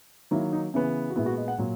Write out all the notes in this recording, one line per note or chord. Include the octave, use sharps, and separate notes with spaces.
D#3 F#3 A#3 E4
D#4
C#3 E3 B3 C#4
F#4
A#2 G#3 B3 E4
F#4
D#5
F#5
A#2 F#3